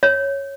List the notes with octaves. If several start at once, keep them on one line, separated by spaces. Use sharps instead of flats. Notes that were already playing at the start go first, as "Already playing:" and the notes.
C#5